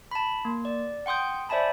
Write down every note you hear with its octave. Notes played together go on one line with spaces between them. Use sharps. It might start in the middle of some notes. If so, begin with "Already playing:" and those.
A5 B5
A#3
D5
F#5 G5 C6 D#6 G6
C5 D5 E5 G#5 A5 B5